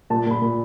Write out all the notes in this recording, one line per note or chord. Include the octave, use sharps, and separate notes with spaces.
A#2 A5
A#2 B5
A#2